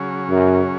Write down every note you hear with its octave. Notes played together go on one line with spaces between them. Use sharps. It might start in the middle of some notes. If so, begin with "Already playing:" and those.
Already playing: C#3 F#3 C#4 G#4
F#2